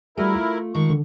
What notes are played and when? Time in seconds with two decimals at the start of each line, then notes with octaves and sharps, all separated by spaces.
0.17 G3 A3 E4 F#4 G#4 A#4
0.35 F4
0.74 D#3 G#3 A4 C#6
0.90 D3